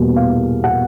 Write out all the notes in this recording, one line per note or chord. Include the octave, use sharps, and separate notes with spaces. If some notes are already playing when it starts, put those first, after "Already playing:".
Already playing: E2 B2 G3 A#3
F5
F#5